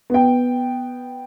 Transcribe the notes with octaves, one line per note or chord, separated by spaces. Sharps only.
B3 G5